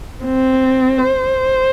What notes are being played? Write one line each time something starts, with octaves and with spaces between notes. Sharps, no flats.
C4
C5